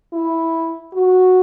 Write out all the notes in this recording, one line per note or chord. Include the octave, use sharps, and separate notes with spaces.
E4
F#4